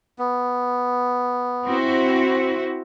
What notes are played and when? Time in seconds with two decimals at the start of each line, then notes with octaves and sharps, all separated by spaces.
0.19 B3
1.66 C4 E4 F#4